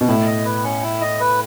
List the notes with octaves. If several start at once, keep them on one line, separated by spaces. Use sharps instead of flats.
B2
A2 E4
D#5
B4
C#4
E4
D#5
B4